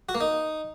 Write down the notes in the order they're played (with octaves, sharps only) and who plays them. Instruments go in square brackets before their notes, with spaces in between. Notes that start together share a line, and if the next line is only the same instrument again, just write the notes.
[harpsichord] F#4
A#3
D#4